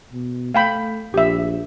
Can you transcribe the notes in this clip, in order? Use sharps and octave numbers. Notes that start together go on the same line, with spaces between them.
B2
A3 F5 G5 B5
A#1 G4 E5